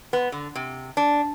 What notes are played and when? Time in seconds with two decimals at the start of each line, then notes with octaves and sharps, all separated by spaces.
0.13 B3
0.32 D3
0.55 C3
0.97 D4